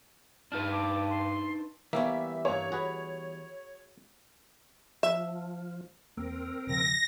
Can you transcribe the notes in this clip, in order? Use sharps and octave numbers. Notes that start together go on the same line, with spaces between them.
G2 D4 D#4 B4 F6
D6
C6
E3 G3 A#3 B3 C#5 E5
G2 A#3 C#5
F#4 G#4 B4
F3 E5
E2 A#3 C4 A#4
E1 C#3 F3 A#6